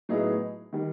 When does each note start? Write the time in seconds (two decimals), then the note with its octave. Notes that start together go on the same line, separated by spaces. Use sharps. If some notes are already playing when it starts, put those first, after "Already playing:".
0.09 A2 F#3 B3 D#4 G#4
0.73 D#3 G3